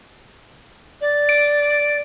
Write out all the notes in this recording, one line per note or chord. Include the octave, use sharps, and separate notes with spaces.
D5
D7